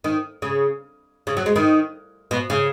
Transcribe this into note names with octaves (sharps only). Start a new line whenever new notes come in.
D#3
C#3
C#3
F#3
G#3
D#3
B2
C#3